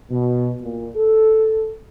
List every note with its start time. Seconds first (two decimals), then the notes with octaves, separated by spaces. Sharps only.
0.10 B2
0.61 A#2
0.96 A4